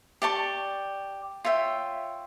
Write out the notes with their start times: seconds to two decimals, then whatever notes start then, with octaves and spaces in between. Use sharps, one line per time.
0.22 G4 D5 A5 C#6
1.44 F4 C#5 E5 G5